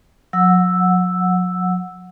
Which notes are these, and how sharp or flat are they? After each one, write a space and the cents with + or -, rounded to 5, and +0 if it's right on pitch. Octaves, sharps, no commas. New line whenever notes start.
F#3 -35 F#5 -15 E6 +0